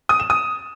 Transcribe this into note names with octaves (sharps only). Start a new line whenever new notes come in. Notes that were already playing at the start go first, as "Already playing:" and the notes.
D#6
E7
D#6